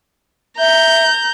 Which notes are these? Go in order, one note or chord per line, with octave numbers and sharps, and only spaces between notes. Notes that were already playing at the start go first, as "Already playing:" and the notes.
E5 A#5 G6